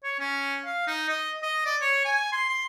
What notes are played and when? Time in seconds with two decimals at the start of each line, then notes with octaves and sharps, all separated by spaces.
0.03 C#5
0.19 C#4
0.65 F5
0.87 D#4
1.09 D#5
1.43 D#5
1.66 D5
1.81 C#5
2.05 G#5
2.32 C6
2.49 C6